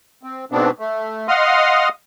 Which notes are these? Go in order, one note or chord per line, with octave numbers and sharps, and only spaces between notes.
C4
G#2 B2 B3 C4 D4
A3
D#5 F5 F#5 C6 D#6 F6